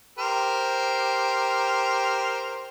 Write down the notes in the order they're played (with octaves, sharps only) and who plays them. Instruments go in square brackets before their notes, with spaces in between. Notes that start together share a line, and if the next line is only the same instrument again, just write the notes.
[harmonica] G4 A#4 C5